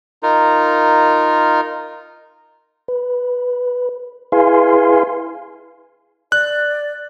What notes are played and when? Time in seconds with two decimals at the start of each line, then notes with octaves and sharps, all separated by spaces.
0.23 D#4 F4 A#4
2.88 B4
4.32 E4 G#4 B4 F5 G#5 C6
6.32 D5 F#6